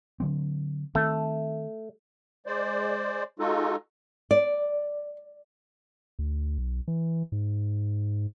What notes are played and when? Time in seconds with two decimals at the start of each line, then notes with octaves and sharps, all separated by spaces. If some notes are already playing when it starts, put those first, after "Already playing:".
0.20 D3 F#3 C4
0.95 D#3 A3 C4
2.46 G#3 C5 D5
3.39 G#3 D#4 F4 F#4 A4
4.31 D5
6.19 D2
6.58 B1
6.88 E3
7.32 G#2